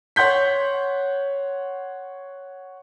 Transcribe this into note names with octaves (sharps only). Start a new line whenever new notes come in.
C#5 F#5 C6 G6 B6